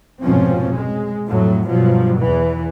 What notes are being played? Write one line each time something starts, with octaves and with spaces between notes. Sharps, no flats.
F1 G#2 B2 F3 C4 C#4
G#3
F2 A2 F#3 A3
G2 B2 F3 F#3
E2 E3